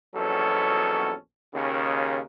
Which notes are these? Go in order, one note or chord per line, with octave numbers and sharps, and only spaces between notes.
A#1 E2 B2 F#3 C#4 A4
D#2 C#3